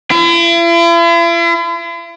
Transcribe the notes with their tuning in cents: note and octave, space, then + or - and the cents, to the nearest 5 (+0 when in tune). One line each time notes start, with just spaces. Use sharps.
E4 +45